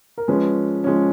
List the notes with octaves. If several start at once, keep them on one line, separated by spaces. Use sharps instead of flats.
A#4
F3 G#3 C#4 B4
F3 G#3 C#4